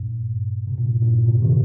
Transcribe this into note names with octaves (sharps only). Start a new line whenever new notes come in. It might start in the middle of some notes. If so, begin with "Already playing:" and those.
Already playing: G2 A#2
C3
G2 A#2
G2 A#2
A2 C3
C3 D#3